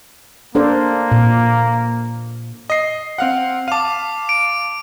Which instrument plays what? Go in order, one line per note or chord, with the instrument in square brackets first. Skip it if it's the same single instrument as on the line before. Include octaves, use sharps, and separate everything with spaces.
[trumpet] A#3 [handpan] D4 A4 C5
[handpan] A#2
[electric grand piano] D#5 C7
C4 F5 F#5
[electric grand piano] F5 A5 [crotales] D6 D#7
[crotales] D7